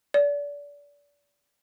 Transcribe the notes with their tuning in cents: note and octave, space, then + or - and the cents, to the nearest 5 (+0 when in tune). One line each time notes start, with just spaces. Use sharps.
D5 -30